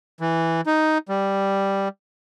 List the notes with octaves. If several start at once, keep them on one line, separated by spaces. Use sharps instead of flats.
E3
D#4
G3